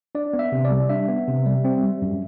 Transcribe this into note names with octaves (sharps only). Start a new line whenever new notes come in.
D4 D5
B3
E5
C3
D5
G3
D4 E5
B3
C3
G3
C4
G3
F#2